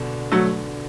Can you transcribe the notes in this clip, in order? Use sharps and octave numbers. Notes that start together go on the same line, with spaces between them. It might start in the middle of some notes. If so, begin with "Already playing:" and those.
Already playing: B2 D3
F#3 A3